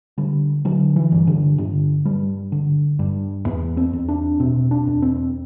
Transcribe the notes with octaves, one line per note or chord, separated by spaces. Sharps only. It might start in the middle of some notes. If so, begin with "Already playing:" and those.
D3 G3
D3 F#3
E3
G2
D3
G2 D3
G2 G3
D3
G2
E2 B3
C4
E2
D4
B2 C4
D4
E2
C4